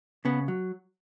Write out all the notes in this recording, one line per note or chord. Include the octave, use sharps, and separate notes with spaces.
C#3 B3
F#3